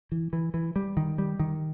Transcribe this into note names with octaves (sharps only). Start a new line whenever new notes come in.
E3
E3
E3
G3
D#3
G3
D#3